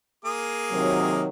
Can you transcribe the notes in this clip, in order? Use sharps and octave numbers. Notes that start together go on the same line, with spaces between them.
A#3 G#4 D#6
C3 D#3 F#3